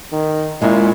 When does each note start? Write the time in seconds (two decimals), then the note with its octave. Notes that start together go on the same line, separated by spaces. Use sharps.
0.12 D#3
0.62 A#2 G#3 C#4 E4